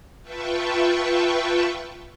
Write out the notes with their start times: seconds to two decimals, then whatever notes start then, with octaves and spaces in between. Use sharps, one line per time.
0.23 F4 B4 E5 G5 A5 C#6